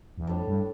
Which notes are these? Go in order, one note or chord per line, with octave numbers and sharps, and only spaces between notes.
E2
F2 A2 G3 D4
G2